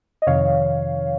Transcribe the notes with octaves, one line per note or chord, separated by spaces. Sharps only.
D#5
F2 C3 D#3 C#5 F5